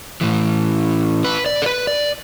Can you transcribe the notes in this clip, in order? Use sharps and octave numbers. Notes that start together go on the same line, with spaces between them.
A2 E3
B4
D5
A4
B4
D5